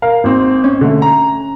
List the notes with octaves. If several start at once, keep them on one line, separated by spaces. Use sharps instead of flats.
A#4 F5
G#1 C4
C#4
D3 A3
A#5